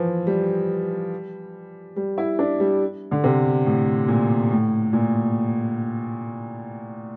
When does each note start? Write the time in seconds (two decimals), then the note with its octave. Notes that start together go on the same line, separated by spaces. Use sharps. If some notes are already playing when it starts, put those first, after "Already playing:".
Already playing: E3 F3
0.27 G3
1.96 G3
2.18 E4
2.39 D4
2.60 G3
3.11 D3
3.24 C3
3.66 A2
4.08 A#2
4.50 A2
4.93 A#2